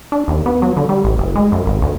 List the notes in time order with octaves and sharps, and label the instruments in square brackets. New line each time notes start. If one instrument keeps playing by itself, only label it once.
[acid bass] D4
D#2
B3
F#3
D3
G3
A1
F#1
G#3
F#2
G#1
D2